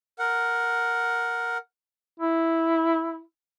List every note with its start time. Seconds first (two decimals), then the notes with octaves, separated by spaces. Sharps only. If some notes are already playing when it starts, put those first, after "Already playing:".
0.19 A#4 F#5
2.20 E4